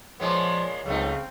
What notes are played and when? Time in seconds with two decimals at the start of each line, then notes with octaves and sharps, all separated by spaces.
0.20 A#2 F3 G#3 B3 C#5
0.86 C#2 C#3 F#3 A3 C4 D#4